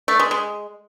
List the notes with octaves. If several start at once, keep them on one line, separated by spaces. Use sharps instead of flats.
A3
G#3
G#3